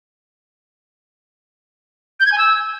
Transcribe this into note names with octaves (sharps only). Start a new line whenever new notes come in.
G6
G#6
G#5
E6